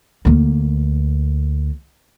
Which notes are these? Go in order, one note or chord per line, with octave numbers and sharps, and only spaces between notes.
D2 A#3